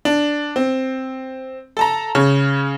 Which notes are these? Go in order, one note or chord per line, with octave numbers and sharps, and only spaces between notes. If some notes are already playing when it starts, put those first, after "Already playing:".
D4
C4
A4 A5 A#5
C#3 C#4